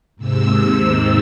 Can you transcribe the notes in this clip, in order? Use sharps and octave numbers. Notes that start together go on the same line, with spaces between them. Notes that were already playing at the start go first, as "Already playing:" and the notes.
D#2 G#2 C3 E6